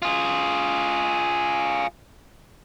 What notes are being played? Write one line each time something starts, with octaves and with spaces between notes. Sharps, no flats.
F4 G#4